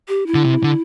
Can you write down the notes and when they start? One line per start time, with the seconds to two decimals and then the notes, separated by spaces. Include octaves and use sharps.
0.09 G4
0.27 E4
0.34 D3
0.45 C3
0.63 D3